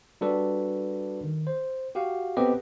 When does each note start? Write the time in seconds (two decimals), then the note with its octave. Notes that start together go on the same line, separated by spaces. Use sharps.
0.21 G3 D4 F#4 A4 B4 D5
1.24 D#3
1.47 C5
1.95 F#4 G4 F5 F#5
2.37 B3 C4 G4 A4 B4 D#5